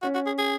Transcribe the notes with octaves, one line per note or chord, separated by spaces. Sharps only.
C#4 F#4
F#4
G#4
G#4